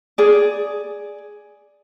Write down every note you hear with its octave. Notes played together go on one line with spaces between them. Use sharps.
G#4 D5